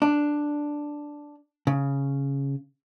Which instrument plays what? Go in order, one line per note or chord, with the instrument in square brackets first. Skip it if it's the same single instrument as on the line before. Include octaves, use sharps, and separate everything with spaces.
[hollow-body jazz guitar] D4
C#3